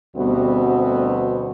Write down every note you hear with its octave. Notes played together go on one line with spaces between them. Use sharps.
D2 B2 G3 B3 C4 F#4